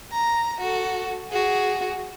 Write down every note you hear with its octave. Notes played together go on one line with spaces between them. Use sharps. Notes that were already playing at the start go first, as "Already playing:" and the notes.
A#5
F#4 A4
F#4 G#4